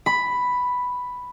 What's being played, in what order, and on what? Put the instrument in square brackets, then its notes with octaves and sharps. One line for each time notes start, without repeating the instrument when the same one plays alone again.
[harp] B5